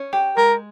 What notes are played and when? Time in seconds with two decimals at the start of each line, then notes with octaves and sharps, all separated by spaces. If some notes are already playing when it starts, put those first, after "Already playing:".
Already playing: C#4
0.13 G4
0.37 G#3 A#4